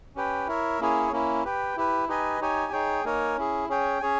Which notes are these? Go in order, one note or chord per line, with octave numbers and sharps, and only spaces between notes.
C#4 G4 B4 G5
E4 A#4 C#5 E5
A#3 C#4 E4 G#4 C#5
A#3 C#4 E4
G4 B4 G5
E4 G4 B4
D#4 G4 B4 D#5 G#5
D#4 G4 C#5 G#5
D#4 G#4 C#5 G5
A#3 D#4 A#4 C#5 G#5
C#4 E4 G#4
C#4 G#4 C#5 G5
C#4 G#4 C#5 G#5